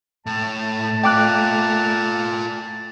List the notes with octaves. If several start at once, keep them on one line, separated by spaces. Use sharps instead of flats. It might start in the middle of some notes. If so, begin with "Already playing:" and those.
A2 A3 A5
F4 D5 G5 D6 F#6